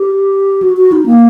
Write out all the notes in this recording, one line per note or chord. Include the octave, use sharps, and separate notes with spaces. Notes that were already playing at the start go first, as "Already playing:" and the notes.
Already playing: G4
F#4
F#4
D#4
A#3